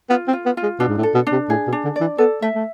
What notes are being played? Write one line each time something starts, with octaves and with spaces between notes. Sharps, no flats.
B3 F4
C4
F4
B3
F4
G#3
B2 D4
G#2
A2
A4
B2
D4
C3
A2 G#4
B2
D4
D3
D5
E3
B3 A4
A3 E5
A3